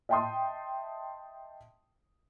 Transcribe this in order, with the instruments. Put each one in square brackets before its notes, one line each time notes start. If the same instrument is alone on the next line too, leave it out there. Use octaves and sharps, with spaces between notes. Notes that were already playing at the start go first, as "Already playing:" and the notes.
[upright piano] D#5 E5 G5 A5 C6 D#6